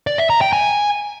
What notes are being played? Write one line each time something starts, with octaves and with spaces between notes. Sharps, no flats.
D5
E5
A#5
G5
G#5